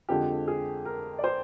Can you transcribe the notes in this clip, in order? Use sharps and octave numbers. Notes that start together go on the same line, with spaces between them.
F2 D3 F3 G#3 G4
G#4
A#4
D5
C5